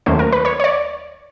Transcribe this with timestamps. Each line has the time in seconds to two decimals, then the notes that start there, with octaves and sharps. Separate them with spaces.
0.06 D#2 D#3 F#3 A3 C#4 C5
0.19 A#4
0.32 B4
0.45 C#5
0.60 C#5
0.64 D5